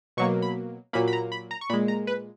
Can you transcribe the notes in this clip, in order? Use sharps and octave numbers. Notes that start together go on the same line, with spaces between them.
B2 F#3 A#3 C#6
B5
A#2 F#3 A#3 B5
B5
A#5
B5
A#5
C#6
A#2 G#3 B5
A#5
B4